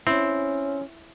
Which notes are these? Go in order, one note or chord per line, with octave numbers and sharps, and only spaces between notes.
C4 C#4 E4